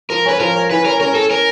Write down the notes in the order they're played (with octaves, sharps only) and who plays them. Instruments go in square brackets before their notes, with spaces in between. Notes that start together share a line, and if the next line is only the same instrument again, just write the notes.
[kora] F3 [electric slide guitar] A#4
[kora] C#4 [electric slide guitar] B4
[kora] F3 [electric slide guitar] A#4
[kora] C#4
[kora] E3 [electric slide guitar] B4
[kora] C#4 [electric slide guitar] A#4
[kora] C#4 [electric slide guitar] A#4
[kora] C#4 [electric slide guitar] A4
[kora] C#4 [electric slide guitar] A#4